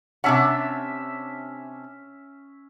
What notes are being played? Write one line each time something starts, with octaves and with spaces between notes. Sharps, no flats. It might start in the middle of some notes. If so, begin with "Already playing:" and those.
C3 C#4 D4 E5 F#5